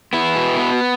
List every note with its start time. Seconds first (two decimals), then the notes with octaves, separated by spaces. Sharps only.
0.13 B3 E4
0.36 B2
0.59 B3